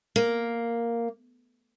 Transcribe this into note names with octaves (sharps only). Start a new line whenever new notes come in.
A#3